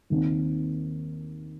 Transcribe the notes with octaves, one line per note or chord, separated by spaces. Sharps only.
D#2 D#3 C4 D#4